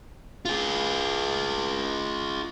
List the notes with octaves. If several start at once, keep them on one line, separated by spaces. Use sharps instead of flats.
F4 G#4